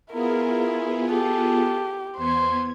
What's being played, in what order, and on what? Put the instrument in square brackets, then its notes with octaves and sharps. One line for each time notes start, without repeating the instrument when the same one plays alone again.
[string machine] B3 F4 G#4 [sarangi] E4 [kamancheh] A#4
[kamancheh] G4 [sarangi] A4
[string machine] E2 B3 G#6 [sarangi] C5